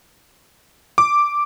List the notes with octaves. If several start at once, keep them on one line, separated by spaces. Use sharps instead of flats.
D6